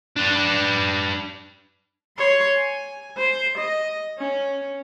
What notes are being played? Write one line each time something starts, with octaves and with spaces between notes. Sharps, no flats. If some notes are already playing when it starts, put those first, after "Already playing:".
D4 B4
C#5 C6
G#5
C5
D#5
C#4